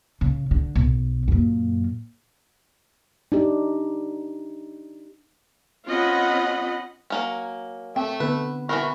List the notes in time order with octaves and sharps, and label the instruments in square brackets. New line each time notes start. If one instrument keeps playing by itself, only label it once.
[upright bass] C#3
D3
B1
F#2 A#2
[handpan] D4 D#4 G4
[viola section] C4 C#4 F4 D#5 F#5 B5
[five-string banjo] F#3 A#3 C#4
[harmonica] A3 E5 [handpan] C4 [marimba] G5
[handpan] D3 B3 [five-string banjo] B4
[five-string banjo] E3 F#4 A#4 [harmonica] B5 C#6